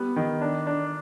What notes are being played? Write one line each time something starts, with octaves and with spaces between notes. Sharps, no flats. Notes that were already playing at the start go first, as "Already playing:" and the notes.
Already playing: G3 B3
D#3
D4
D4